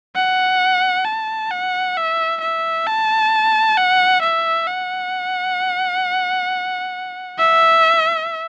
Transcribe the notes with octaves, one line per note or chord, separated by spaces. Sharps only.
F#5
A5
F#5
E5
E5
A5
F#5
E5
F#5
E5